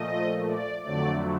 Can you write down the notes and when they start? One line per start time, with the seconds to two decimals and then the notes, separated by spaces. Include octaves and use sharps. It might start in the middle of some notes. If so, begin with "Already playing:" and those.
Already playing: A#2 F3 A3 D#5
0.48 D5
0.83 F2 D3 F#3 A3 D5